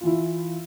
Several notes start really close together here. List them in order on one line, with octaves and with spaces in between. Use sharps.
F4 E3 E4